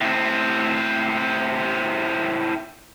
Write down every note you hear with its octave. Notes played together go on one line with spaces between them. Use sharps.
A2 C4